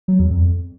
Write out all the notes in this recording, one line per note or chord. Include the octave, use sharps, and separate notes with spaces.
F#3
E2
F2